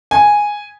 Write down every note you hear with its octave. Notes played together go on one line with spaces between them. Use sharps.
G#5